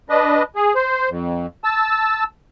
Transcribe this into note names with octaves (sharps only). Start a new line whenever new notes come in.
D4 B4 D#5
G#4
C5
F2
A5 E6